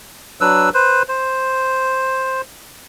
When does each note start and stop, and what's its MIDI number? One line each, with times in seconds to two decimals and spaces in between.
0.41 0.70 54
0.41 0.70 62
0.41 0.70 71
0.41 0.70 88
0.74 1.03 71
0.74 1.03 72
1.08 2.41 72